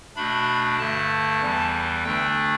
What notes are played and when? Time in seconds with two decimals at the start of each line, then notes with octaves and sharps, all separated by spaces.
0.16 B2 A3 D4 B5
0.78 G2 D3 A3 A5
1.41 E2 E3 G3
2.04 D2 D3 A3 D4 G5